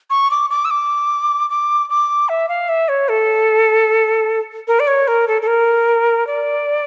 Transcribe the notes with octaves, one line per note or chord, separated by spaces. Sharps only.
C#6
D6
D6
E6
D6
D6
D6
E5
F5
E5
C#5
A4
A#4
D5
C#5
A#4
A4
A4
A#4
D5